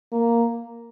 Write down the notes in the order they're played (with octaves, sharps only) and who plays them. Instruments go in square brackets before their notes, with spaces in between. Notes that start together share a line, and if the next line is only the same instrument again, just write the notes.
[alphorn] A#3